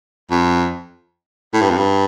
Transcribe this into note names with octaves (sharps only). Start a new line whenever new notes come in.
F2
A2
G2
F2
G2